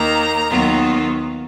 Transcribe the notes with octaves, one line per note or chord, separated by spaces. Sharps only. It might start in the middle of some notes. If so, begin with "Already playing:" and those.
Already playing: D#2 D#3 A#3 A#5
D#2 D#3 F#3 B3 F4